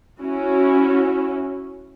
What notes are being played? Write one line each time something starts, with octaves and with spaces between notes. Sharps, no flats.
C#4 E4 F#4